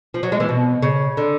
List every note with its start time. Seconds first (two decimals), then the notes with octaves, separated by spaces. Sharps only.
0.14 F3
0.23 F#3
0.32 G#3
0.40 E3
0.49 B2
0.82 C#3
1.17 D3